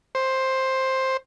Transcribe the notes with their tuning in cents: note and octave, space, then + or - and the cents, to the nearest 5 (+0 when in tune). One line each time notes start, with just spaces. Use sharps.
C5 +10